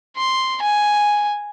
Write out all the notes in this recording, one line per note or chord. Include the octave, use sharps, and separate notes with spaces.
C6
G#5